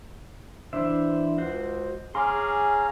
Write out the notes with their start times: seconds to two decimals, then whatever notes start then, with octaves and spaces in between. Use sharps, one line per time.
0.73 E3 D4 C5 E5
1.38 C#2 F#4 C5
2.15 C#4 G#4 F5 A#5 C6 D6 F6